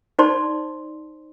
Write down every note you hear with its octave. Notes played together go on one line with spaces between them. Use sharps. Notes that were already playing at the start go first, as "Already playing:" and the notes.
D#4 C5 D5 A5 C6